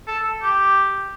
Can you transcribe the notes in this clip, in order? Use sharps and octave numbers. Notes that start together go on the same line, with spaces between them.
A4
G4